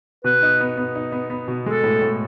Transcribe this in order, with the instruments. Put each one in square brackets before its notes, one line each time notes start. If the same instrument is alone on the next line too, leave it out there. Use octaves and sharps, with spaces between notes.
[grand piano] B2 [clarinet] B4
[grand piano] D#4
B3
B3
D#4
B3
B3
B2
[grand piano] G#3 [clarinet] A4
[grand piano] A2
A2